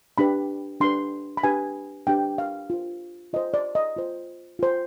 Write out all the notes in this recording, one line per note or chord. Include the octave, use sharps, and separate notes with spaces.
D4 G4 B4 B5
D4 G4 B4 C6
B5
D4 G4 B4 G#5
D4 G4 B4 G5
F5
F4 C5
F4 C5 D#5
D5
D#5
F4 C5
F4 C5